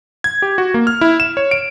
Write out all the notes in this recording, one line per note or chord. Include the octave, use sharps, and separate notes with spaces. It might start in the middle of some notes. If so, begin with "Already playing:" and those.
G#6
G4
F#4
A#3
F6
E4
E7
C#5
D7